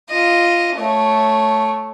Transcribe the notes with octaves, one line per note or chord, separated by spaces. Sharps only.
F4 D#5
A3 C#5